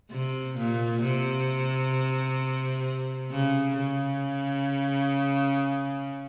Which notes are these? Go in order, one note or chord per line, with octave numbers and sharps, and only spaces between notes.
C3
A#2
C3
C#3
C#3